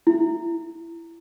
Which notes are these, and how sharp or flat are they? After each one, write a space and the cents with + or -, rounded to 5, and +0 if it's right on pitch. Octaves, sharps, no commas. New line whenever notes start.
E4 +20